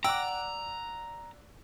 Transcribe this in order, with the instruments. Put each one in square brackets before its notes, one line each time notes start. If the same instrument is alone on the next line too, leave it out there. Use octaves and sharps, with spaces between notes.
[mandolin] D5 F#5 D6 [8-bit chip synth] G5 [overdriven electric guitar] A#5 [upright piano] E6